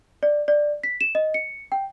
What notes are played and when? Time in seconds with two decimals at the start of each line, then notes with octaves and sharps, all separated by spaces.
0.23 D5
0.48 D5
0.84 B6
1.01 E7
1.15 D#5
1.34 C#7
1.72 G5